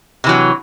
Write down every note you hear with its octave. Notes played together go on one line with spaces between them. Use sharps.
C3 E3 F#3